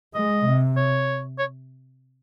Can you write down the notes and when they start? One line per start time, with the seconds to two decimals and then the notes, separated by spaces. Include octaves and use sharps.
0.15 G#3 D#5
0.46 C3
0.77 C#5
1.39 C#5